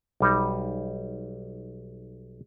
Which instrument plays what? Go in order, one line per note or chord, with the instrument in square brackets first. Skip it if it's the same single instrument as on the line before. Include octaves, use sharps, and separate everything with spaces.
[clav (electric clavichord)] B1 G3 D#4